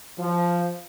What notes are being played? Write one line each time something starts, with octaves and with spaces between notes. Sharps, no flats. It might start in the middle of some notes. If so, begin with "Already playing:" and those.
F3